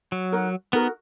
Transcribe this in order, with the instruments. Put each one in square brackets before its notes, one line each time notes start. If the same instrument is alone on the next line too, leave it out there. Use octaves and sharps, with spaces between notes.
[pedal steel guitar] F#3
[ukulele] D#4 F#4 A#4
[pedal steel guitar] B3 [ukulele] D#4 F#4 A#4